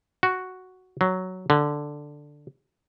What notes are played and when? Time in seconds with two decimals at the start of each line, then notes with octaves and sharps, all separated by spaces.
0.23 F#4
1.01 F#3
1.50 D3